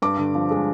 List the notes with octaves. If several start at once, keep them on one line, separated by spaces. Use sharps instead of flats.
G2 D6
D3
F3
G#3